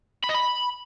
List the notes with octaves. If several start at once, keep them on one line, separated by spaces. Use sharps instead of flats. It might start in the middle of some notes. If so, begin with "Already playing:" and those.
B5
D#5
B5